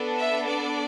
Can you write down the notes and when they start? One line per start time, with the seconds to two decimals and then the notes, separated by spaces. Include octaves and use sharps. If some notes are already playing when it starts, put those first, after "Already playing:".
Already playing: B3 D4 A4
0.15 E5
0.46 D5